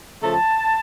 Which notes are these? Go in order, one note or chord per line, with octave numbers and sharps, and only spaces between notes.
C#3 F3 A3 A5